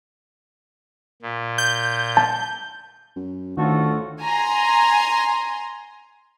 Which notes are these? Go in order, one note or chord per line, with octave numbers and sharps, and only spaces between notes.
A#2
G6
A5
F#2
D2 A2 D#3 F4 F#4 A4
G#5 A#5 C6